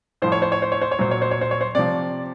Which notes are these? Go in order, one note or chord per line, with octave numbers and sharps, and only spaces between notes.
A2 F3 C5
C#5
C5
C#5
C5
C#5
C5
C#5
A#2 F#3 C5
C#5
C5
C#5
C5
C#5
C5
C3 F3 D5